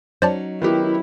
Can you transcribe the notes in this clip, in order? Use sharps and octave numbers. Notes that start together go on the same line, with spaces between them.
F#3 C#4 D#4 C5 D5 A5
D#3 B3 E4 G4